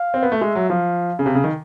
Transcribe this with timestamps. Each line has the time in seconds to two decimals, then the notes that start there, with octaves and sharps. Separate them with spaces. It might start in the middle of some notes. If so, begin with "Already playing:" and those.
Already playing: F5
0.14 C4
0.23 B3
0.32 A3
0.41 G#3 E5
0.55 F#3
0.69 F3 F5
1.19 C#3
1.25 C3 F5
1.35 C#3
1.44 D#3